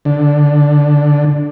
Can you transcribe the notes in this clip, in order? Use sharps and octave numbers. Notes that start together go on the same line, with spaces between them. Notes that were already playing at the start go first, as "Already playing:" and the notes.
D3